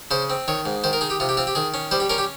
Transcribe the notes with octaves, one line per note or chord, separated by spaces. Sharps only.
C#3 C5
C4
D#3 C#5
G#2
D#3 C5
A#4
D#4 G#4
G4
C3 F4
G4
C4 F4
G4
D#3 G#4
C#4
G3 C5
G4
C#4 A#4
G4